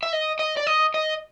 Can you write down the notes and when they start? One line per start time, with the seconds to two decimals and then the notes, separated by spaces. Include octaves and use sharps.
0.03 E5
0.13 D#5
0.39 D#5
0.57 D5
0.67 D#5
0.94 D#5